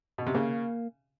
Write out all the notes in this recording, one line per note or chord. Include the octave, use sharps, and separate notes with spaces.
B2
C3
C#3 A#3